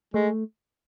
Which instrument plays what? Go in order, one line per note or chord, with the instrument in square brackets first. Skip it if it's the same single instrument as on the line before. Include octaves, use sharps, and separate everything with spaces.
[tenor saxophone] G#3 [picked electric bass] A3